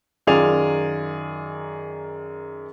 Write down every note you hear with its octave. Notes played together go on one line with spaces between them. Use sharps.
F#2 D#3 F4 G#4 D5 F7